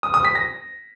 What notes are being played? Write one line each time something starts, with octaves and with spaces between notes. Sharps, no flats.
D#6
D#6
B6
A#6